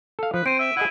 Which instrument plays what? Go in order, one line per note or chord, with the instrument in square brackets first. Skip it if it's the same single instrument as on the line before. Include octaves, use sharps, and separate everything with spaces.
[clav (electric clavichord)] A4 F5
[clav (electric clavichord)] F3 [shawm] B4
[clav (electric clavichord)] C4 [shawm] C5 [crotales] D7 D#7
[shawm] E5 [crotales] E6
[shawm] E4 [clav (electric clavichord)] G#4 D#5 F#5